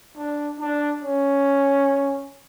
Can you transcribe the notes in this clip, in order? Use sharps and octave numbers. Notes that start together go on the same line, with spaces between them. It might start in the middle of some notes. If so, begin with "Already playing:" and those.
D4
D4
C#4